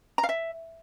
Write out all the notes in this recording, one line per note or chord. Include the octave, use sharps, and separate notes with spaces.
A#5
F5
E5